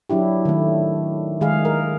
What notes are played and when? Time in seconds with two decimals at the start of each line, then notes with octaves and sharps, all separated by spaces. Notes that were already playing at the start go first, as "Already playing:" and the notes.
0.10 F#3 D4 E4 G4
0.45 D#3 A3
1.41 D#3 G#3 G#4 F5
1.65 A#4